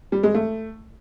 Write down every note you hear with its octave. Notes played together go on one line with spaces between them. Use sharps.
G3
G#3
A3